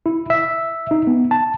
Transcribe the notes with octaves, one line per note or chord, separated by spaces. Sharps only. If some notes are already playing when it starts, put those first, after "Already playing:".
E4
E5
D#4
B3
A5